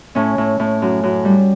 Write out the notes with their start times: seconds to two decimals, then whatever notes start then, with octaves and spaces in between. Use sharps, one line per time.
0.15 A2 C#4
0.38 A2
0.59 A2
0.82 F#2
1.03 F#2
1.25 G3